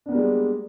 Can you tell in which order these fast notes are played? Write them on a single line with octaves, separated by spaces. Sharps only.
D4 B3 A#3 G3 G#3